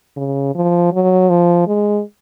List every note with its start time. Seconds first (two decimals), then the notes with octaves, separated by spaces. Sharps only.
0.17 C#3
0.55 F3
0.93 F#3
1.30 F3
1.67 G#3